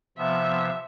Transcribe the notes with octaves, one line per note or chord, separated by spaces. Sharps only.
C3 F3 B3 E5